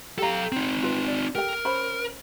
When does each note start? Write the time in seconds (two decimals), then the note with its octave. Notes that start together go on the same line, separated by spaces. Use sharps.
0.18 G4 A4 F5 A#5
0.52 C4 D#4
0.83 F4 B4
1.08 D5
1.35 G4 A4 A#4 G5
1.65 C#4 C5 B5